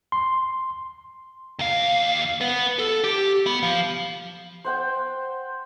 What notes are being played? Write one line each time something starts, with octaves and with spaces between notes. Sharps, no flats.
C6
D#2 F5
B3 B4
A4
G4
B3
F3
C5 F#5 G5